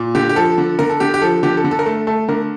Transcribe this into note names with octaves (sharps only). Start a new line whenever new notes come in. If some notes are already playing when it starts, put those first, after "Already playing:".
Already playing: A#2
D3 G4
G4
F3 A4
D3
D3 A#4
A4
D3 G4
G4
F3 A4
D3 G4
A4
D3
A4
A#4
A3 A4
A3 A4
D3 A#4